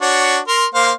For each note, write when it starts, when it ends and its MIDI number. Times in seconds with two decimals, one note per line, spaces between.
0.02 0.39 62
0.02 0.39 66
0.02 0.39 73
0.48 0.65 70
0.48 0.65 84
0.74 0.92 58
0.74 0.92 72
0.74 0.92 77